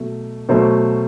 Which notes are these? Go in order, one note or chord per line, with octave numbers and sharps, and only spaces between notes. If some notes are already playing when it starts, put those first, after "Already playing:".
Already playing: B2 F#3 A3
B2 F#3 A3 C5